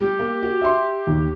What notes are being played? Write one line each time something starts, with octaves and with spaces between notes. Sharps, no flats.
G3 G4
A#3
F#4
E5 C6
D#2